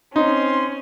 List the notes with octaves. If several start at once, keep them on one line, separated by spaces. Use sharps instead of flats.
C4 C#4 D#4 C6